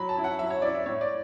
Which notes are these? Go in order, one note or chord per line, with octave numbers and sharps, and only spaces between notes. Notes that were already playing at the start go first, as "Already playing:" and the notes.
Already playing: F#3 B5
A5
C#4 E4
F#5
F#3 E5
C#5
C#4 E4 D5
E5
A2 C#5
D5